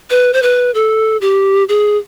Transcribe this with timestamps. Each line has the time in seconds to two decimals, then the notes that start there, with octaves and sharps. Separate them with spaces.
0.10 B4
0.33 C5
0.43 B4
0.75 A4
1.21 G4
1.69 G#4